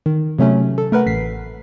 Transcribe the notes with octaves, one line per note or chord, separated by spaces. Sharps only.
D#3
C3 F#3 A3 C#4
A4
A3 A#4 B4 F#5
A1 B6 C7